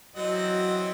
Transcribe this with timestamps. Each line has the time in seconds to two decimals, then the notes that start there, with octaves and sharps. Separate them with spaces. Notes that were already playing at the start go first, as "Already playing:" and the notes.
0.16 E3 F#3 C4 D#5 F#5